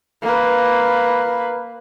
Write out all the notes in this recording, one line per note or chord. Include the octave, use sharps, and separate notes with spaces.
A#3 B4